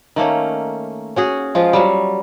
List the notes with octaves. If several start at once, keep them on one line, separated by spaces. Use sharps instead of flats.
D#3 A3 A#3 C#4
C#4 F#4 G#4
F3 G#3 F4
F#3 G3